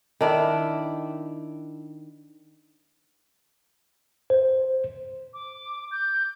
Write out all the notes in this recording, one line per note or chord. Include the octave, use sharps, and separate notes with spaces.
D#3 D4 E4
C5
D6
G6